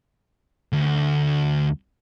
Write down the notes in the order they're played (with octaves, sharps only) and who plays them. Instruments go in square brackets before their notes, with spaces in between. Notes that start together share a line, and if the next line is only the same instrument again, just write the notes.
[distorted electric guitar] D2